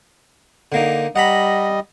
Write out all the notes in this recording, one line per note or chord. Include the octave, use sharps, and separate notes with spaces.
D3 A#3 D#4
G3 D#5 F#5 A#5 B5